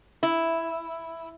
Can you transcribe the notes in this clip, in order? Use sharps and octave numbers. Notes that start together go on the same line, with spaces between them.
E4